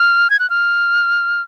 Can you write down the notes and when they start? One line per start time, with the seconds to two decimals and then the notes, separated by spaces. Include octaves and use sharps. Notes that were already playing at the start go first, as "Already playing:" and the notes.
Already playing: F6
0.30 G#6
0.39 F#6
0.50 F6